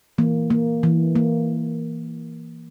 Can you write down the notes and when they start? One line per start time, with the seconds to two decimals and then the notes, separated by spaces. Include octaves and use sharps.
0.18 E3 A#3
0.50 A#3
0.83 E3
1.16 A#3